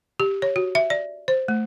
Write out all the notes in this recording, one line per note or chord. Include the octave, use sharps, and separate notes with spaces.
G4
C#5
F#4
E5
D5
C5
A3